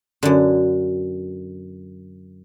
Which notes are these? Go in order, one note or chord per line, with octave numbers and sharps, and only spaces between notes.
F#2 D3